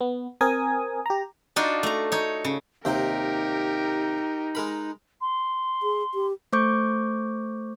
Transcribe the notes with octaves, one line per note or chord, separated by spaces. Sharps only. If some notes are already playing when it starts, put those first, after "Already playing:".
B3
C4 A#4 G#5 D#6
G4 A#5
D4 D#4 F4 F#4
A3 A#5
D#4 C#5
C#3
D#2 C3 D#4 G4 A#4 G5
G#3 A#4 B5
C6
G#4
G4
A3 C5 C#6 D6 G6